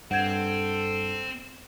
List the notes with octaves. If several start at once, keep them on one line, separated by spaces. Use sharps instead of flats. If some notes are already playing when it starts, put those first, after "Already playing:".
G2 C4 A4 F#5 G6 G#6